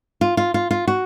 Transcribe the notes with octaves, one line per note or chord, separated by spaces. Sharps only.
F4
F4
F4
F4
F#4